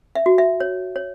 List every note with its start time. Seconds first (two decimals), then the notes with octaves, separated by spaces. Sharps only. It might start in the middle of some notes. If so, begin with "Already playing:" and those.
0.15 E5
0.26 F#4
0.38 E5
0.60 C#5
0.96 C#5